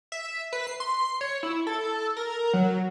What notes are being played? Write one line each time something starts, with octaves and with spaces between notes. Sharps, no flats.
E5
B4
C7
C6
C#5
E4
A4
A#4
F#3